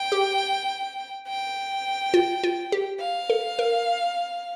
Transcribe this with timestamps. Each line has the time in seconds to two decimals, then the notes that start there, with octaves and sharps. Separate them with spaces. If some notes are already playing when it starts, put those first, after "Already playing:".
Already playing: G5
0.12 G4
1.28 G5
2.14 F4
2.43 F4
2.72 G4
3.00 F5
3.30 A4
3.59 A#4